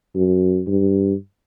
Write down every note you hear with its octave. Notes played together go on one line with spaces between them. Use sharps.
F#2
G2